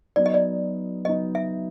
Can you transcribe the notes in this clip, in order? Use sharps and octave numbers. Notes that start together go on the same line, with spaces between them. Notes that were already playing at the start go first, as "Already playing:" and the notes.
F#3 B3 D#4 D5
D#5
D5
F#3 B3 D#4 D#5
E5